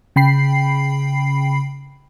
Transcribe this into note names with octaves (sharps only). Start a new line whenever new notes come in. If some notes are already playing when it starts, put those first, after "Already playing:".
C#3 G5 B5 C7